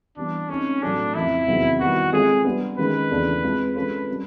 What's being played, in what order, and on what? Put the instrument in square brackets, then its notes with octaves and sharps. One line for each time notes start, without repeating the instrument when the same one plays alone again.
[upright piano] E3 G3 B3 [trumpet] D4
[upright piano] A3 C4 D#4 [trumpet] C#4
[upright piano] A2 F#3 A3 [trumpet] D4
[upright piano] F2 C#3 F3 A#3 [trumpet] E4
[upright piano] E2 C3 D#3 F#3 B3
[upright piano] D#3 G3 B3 E4 [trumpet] F#4
[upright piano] G#3 C4 F4 A4 C#5 [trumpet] G#4
[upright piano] G3 B3 D4
[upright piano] D#3 G#3 C#4 [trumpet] B4
[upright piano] E2 C#3 E3 A3 D4
G#3 C4 F4
[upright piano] G#3 C#4 F4 A4 C#5 [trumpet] B4
[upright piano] G3 A#3 C#4